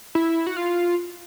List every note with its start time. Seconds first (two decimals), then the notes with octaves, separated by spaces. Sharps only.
0.15 E4
0.47 F#4
0.57 F4